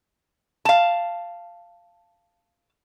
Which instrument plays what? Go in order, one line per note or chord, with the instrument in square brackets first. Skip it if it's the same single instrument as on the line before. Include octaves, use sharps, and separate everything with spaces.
[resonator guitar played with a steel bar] F5 A5